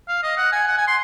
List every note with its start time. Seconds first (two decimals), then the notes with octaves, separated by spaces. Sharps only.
0.08 F5
0.23 D#5
0.38 F#5
0.52 G#5
0.68 F#5
0.78 G#5
0.87 C6